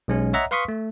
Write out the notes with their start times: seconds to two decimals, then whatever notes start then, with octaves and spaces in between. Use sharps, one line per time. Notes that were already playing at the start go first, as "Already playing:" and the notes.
0.08 B1 G#3 C#4
0.33 C#5 D#5 E5 F#5 A#5
0.51 B4 F5 C6 C#6 D#6 B6
0.68 A3